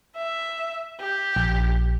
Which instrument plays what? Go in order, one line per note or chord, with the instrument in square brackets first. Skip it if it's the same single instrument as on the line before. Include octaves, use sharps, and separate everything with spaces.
[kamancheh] E5
G4
[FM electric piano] A#1